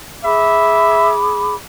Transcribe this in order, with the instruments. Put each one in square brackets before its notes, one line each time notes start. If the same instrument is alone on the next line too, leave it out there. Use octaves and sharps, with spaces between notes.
[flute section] G#4 B5 D6 [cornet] E5